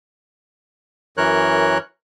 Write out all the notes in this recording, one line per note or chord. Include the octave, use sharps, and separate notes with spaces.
F#2 E3 A#4 C#5 F#6